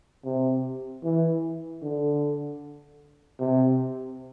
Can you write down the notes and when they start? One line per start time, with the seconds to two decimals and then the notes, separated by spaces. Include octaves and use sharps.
0.25 C3
1.03 E3
1.82 D3
3.40 C3